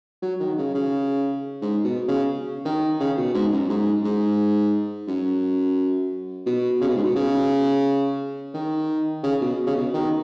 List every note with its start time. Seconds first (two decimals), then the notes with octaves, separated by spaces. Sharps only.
0.22 F#3
0.40 D#3
0.57 C#3
0.74 C#3
1.61 G#2
1.84 B2
2.08 C#3
2.65 D#3
3.00 C#3
3.17 B2
3.34 G#2
3.52 F#2
3.69 G#2
4.04 G#2
5.07 F#2
6.46 B2
6.81 C#3
6.88 B2
6.96 G#2
7.03 B2
7.15 C#3
8.54 D#3
9.23 C#3
9.41 B2
9.67 C#3
9.75 B2
9.93 D#3